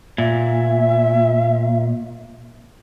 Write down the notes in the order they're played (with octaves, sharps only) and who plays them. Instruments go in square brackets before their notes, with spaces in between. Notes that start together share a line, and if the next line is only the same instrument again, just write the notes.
[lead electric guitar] A#2 [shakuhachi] E5